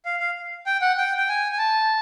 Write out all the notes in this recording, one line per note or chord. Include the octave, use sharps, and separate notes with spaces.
F5
F5
G5
F#5
G5
G5
G#5
G#5
A5